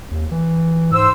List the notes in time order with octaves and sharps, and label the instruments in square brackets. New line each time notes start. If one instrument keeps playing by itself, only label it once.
[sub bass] D#2
E3
[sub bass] G#2 [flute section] C5 E6